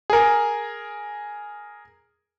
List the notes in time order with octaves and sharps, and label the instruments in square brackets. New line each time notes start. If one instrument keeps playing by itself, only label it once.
[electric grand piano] G#4 A#4